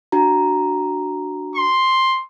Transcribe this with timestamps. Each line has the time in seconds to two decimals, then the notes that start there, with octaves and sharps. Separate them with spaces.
0.12 D4 F#4 A#5
1.56 C6